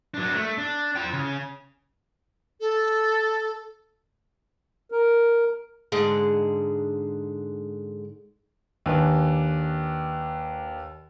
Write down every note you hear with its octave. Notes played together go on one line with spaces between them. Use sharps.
F#3 D4
A3
D4
F4 G5
C#3
A4
A#4
G#2 D3 G#3
D#2 D4 B4 G#5